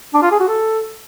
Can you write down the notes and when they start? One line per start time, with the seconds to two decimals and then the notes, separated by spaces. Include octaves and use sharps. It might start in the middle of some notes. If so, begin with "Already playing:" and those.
0.14 D4
0.23 F4
0.31 G#4
0.40 F#4
0.48 A4